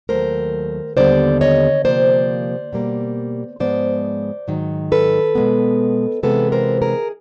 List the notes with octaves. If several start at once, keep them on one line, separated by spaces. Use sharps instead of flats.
D#2 D#3 F#3 A3 A#4 C5
D#2 D3 G3 B3 C5 D5
C#5 D#5
C3 F3 A#3 C5 D5
B2 G3 A#3
G#2 F3 G#3 B3 C5 D5
G#2 D#3 F#3
A4 B4
B2 G#3 B3
C3 E3 G#3 B3 A4 B4
A#4 C5
G#4 A#4